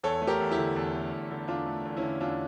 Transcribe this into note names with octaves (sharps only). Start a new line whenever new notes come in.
E2 A4 C#5
A3
G4 A#4
E2
E4 G4
D3
E2
A3
E2
D3
E2 D4 F4
A3
E2
C#4 E4
D3
E2 D4 F4